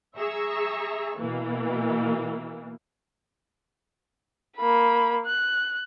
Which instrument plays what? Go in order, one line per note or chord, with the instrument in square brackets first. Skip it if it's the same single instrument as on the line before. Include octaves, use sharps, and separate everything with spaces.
[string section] G#4 E5 A#5 C#6 E6
B2 E3 A#3
[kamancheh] A#3 B5
F#6